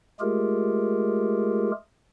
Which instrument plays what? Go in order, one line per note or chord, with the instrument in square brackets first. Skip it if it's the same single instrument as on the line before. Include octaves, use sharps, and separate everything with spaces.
[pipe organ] G#3 A3 F4 G4 G#4 A#4